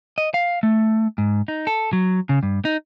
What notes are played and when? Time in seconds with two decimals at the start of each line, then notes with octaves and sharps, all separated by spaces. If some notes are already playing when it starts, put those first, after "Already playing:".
0.18 D#5
0.34 F5
0.63 A3
1.18 G#2
1.48 D#4
1.67 A4
1.93 F#3
2.29 C#3
2.43 G2
2.65 D#4